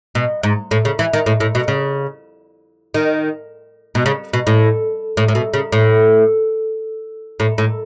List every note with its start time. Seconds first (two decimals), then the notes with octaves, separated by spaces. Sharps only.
0.15 B2
0.43 G#2
0.71 A2
0.85 C#3
0.99 E3
1.13 D#3
1.26 A2
1.40 A2
1.55 B2
1.68 C#3
2.94 D#3
3.95 B2
4.06 C#3
4.33 B2
4.47 A2
5.17 A2
5.28 A2
5.35 B2
5.54 C#3
5.72 A2
7.40 A2
7.58 A2